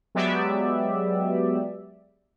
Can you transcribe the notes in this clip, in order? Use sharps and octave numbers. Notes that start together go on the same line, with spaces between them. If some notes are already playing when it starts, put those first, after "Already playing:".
F#3 G#3 B3 G4 D5 E5